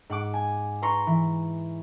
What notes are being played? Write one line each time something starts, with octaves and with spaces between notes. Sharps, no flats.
G#2 F#5 D6
G#5
B4 A#5 C6 C#6
E3